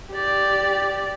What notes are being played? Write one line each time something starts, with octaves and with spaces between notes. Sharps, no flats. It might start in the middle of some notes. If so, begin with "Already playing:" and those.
G4 D5